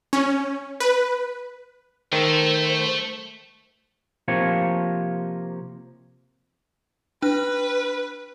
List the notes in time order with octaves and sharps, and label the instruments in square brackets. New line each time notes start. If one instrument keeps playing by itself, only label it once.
[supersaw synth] C#4
B4
[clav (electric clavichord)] D#3 [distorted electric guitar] A3 E5 [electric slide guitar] C5
[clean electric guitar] C3 F3 A#3 F4 G4 C#5
[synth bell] D4 F#6 [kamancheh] B4